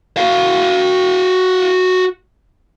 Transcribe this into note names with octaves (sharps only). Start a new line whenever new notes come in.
F#4 F5